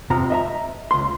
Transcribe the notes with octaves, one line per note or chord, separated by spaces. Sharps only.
F2 C3 F3 A#5
D#5 E5 A#5
C#2 C6